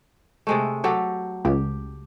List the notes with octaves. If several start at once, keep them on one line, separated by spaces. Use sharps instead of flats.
C3 G#3 A3
F#3 G4 A4
C#2 G4